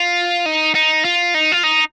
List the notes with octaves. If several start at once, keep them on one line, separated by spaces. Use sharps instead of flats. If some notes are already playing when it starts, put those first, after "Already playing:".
Already playing: F4
D#4
D#4
F4
D#4
F4
D#4